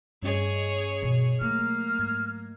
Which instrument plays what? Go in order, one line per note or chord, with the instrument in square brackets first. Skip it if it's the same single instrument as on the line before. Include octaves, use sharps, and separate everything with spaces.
[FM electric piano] G2 C#4 D#5 [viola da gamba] G#4 C#5
[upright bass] B2
[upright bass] F#3 A3 [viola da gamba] A#3 [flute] F6
[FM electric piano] G#2 G#6